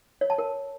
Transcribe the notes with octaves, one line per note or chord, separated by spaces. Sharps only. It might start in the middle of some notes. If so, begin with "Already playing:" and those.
C#5
A5
A#4